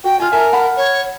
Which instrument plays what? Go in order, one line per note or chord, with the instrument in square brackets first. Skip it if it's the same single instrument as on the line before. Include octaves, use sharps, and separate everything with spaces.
[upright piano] F#4 [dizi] G5
[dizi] F4 [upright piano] G#5 F6
[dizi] A#4 [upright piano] E5 G#5 A5
[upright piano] F#5 A5 B5
[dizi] C#5